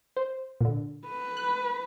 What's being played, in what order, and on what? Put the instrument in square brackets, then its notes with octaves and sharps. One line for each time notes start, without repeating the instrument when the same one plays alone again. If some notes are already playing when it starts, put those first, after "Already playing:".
[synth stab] C5
A#2 D3
[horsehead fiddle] B4
[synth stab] F#6